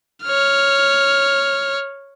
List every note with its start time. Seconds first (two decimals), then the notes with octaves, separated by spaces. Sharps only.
0.25 C#5 F6